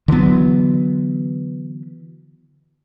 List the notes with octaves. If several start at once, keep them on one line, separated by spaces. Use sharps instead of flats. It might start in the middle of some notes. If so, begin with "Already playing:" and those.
D3 E3 F#3 B3